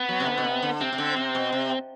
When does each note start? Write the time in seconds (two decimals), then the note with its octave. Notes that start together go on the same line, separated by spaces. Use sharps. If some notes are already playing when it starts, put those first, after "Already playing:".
Already playing: B3
0.09 F#3
0.20 C3
0.26 D3
0.38 B2
0.45 C3
0.62 D3
0.80 C3 C4
0.93 C3
0.98 D3
1.17 C3
1.35 B2
1.53 C3